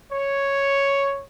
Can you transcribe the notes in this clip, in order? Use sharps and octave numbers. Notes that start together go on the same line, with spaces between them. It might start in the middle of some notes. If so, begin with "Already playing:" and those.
C#5